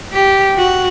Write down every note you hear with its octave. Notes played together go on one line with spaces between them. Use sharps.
G4
F#4